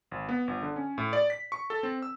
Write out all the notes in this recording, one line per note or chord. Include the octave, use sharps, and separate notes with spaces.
G#1
B3
G1
D3
C#4
A2
D5
B6
C#6
A4
C4
E6